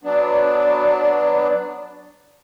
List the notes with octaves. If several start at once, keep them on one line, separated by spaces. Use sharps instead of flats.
F#3 B3 D4